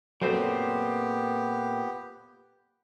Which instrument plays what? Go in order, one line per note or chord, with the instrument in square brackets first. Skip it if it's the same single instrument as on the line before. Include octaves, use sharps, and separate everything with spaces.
[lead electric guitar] A#2 C4 [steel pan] F#3 [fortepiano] A3 C5 [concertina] B3 G4